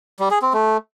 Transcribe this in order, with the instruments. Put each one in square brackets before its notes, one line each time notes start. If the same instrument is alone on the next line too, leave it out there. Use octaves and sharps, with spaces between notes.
[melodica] G3
G#4
C4
A3